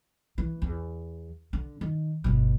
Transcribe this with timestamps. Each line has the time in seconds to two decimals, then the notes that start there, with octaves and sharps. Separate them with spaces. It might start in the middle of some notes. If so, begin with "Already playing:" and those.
0.38 E3
0.62 E2
1.53 D3
1.81 D#3
2.24 G1 B2